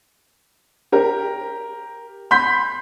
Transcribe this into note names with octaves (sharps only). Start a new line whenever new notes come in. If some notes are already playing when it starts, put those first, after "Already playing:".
G4 A#4
B5 C6 G6 B6